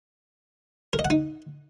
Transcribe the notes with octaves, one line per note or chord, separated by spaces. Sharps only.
A#4
D#5
F#5
D#4